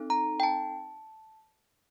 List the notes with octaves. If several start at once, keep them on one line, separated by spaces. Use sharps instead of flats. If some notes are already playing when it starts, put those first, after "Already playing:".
Already playing: C4 D#4 A4
A#5
G5
A5